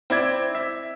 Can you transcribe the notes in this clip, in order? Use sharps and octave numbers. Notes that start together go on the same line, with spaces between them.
C4 E4 D5 G#6
E5